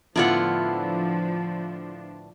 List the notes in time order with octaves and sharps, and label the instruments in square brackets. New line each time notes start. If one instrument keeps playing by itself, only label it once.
[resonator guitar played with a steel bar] A2 D3 B3 [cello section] F3 D4 [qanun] E4 F4 F#5